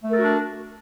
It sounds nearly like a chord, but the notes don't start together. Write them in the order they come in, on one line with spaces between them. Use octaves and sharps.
A3 A#4 A4 F#4 D4